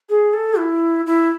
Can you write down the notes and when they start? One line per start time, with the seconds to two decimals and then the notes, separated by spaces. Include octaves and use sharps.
0.09 G#4
0.33 A4
0.58 E4
1.06 E4